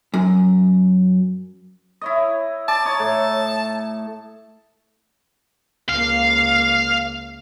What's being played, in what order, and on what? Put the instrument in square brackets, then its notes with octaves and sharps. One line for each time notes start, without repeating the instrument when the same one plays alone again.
[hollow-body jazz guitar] F#2
[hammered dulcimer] E4 C#5 D#5
[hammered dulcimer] D5 [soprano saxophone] A5
[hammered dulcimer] C#5 D#5 A#5
A2
[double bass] C#2 A#3 [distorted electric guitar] F5